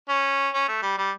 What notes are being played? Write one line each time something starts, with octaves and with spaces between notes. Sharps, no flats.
C#4
C#4
A3
G3
G3